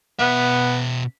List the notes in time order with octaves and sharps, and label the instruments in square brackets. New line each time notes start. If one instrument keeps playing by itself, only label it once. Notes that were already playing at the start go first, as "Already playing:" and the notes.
[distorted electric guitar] B2 E5 [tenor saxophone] B3